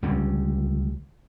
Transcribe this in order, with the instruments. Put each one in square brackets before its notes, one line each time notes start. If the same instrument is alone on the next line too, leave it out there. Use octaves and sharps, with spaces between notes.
[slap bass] C#2 D3 G3 C#4